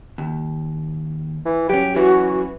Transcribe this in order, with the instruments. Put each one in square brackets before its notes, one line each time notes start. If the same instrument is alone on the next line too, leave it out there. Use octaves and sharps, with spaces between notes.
[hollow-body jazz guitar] D#2
[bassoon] E3
[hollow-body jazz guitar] F#3 C#4 [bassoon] G4
[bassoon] E3 [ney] F#4